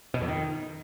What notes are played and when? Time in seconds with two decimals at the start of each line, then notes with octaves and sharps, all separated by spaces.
0.14 B2
0.21 F2
0.28 D#3